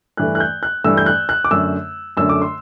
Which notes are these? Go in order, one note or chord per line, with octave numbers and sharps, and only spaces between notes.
G2 E3 A3 F#6
F#6
G6
F#6
G2 E3 A3 E6
G6
F#6
F#6
D6
F#2 D3 A3 E6
F#2 D3 A3 E6
D6
C6